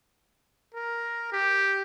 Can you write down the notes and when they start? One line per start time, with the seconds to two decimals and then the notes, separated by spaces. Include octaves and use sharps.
0.74 A#4
1.32 G4